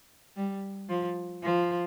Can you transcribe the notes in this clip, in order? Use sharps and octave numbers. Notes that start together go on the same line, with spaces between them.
G3
F3
F3